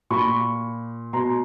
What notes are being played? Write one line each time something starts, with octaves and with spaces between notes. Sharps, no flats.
A#2 B5 C#6
B2 A#5 C6